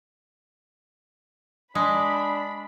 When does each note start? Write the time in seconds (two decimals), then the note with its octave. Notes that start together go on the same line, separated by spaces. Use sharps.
1.75 G#3 D4 B5 D#6